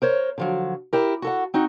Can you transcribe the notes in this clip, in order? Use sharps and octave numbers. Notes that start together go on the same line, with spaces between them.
A#4 C5 C#5
D3 F3 F#3
E4 G4 A#4
F#4 A4 F#5
C4 D#4 F#4